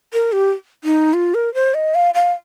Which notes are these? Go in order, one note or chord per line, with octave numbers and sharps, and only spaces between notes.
A#4
G4
D#4
F4
A#4
C5
D#5
F5
F5